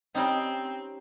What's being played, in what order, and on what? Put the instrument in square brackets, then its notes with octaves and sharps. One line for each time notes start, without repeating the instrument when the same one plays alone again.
[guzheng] G3 C#4 D#4 [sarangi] C4